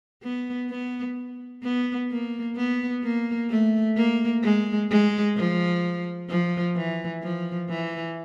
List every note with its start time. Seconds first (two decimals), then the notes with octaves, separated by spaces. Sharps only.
0.23 B3
0.70 B3
1.63 B3
2.10 A#3
2.56 B3
3.04 A#3
3.50 A3
3.96 A#3
4.43 G#3
4.90 G#3
5.36 F3
6.29 F3
6.76 E3
7.23 F3
7.69 E3